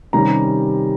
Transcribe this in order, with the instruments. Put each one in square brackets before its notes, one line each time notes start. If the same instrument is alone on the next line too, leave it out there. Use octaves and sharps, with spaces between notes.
[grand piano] C3 D#3 G3 C#4 A#5